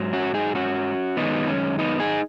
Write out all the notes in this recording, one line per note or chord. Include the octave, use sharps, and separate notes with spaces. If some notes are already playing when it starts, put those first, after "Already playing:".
Already playing: G#2 F#3
C#4 F#4
D#4 G#4
C#4 F#4
F#2 D#3 G#3 B3 D#4
C#4
B3 D#4
D#4 G#4